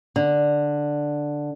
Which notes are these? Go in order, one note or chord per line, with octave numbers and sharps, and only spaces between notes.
D3